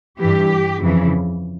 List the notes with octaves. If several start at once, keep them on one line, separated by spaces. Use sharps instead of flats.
G2 E3 G4
F2 C#3 E3